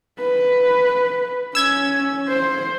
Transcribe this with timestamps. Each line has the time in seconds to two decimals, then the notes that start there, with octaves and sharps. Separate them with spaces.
0.20 B4
1.55 C#4 E6 G#6
2.29 C5